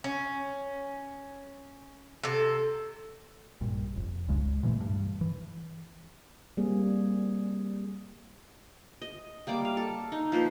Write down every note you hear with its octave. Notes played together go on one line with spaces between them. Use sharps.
C#4
C3 A4
A#1 G2
F1
G#1 C#2 C#3 G#3
A#2 E3 G#3 A3
G2
E3
G3 A#3 C4 G#4
D#5
G3 A#3 D5 D6
F5
A4
D#4
F3 A#3 B4 C5